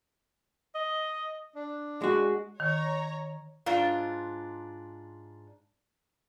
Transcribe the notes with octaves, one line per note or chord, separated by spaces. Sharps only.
D#5
D4
G#3 F#4
D#3 C#5 A#5
G#2 D4 F4